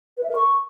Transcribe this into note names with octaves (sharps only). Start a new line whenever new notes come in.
B4
E5
A#4
C#6